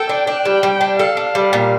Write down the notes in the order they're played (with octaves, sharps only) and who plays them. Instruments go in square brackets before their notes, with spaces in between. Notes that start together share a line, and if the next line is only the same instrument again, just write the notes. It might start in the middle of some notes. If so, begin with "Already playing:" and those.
Already playing: [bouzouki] A4 [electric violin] G5
[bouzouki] D4
D4
[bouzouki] G3 [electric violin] G5
[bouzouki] G3
D4
[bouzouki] A4 [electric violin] F5
[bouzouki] D4
G3
A#2